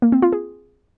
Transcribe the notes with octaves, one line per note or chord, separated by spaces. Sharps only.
A#3
C4
F4
G#4